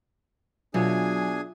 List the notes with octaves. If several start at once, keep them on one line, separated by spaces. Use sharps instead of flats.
B2 F#3 D4 F4 G#4 E5 G#5